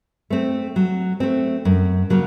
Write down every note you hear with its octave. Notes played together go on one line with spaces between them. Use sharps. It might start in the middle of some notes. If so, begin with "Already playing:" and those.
A3 C4
F#3
A3 C4
F#2
C#3 F#3 A#3